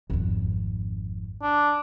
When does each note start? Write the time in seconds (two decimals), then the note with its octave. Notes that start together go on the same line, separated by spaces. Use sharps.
0.10 G#1 F2
1.42 D4